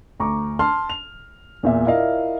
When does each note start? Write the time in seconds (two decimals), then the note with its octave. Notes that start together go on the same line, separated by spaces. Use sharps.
0.20 D2 A#5 C#6 D6
0.59 A5 C6 F6
0.90 F7
1.63 E2 A#2 E5
1.86 E4 F4 A#4 D5 D#5 F5